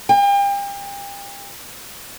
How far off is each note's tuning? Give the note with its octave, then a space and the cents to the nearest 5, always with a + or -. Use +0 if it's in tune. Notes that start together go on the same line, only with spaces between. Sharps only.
G5 +35